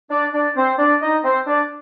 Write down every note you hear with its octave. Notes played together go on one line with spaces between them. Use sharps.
D4 D5
D4 D5
C4 C5
D4 D5
D#4 D#5
C4 C5
D4 D5